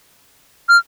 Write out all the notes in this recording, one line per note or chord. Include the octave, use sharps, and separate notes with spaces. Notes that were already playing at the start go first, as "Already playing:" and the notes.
F6